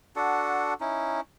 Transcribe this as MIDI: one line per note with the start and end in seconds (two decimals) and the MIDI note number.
0.16 0.74 62
0.16 0.74 66
0.16 0.74 69
0.16 0.74 78
0.81 1.21 61
0.81 1.21 63
0.81 1.21 64